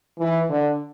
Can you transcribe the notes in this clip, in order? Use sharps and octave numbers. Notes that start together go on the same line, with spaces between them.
E3
D3